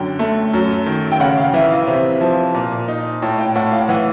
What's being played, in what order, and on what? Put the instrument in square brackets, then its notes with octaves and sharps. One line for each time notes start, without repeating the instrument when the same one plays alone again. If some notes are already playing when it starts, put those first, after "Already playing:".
Already playing: [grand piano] F#2 D3 [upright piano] G5
[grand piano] A3
F#2
D#3
[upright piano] G5
[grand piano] C#3 [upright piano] F#5
[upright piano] F5
[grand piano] E3 [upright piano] E5
[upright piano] F5
[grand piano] C3 [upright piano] E5
[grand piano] F3
A#2
D#4
A2
[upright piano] G5
[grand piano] A2 [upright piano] F#5
[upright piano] F5
[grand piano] E3 [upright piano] F#5